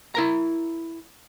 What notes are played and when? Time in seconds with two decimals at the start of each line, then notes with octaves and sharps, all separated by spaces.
0.15 E4 A#4 A#5